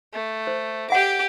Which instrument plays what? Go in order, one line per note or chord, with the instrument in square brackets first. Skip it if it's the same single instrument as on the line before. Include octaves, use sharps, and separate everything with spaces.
[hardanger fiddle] A3
[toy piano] C5
[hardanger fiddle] G4 D6 [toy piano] E5 F#5